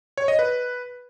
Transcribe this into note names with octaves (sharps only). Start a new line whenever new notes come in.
C#5
D#5
B4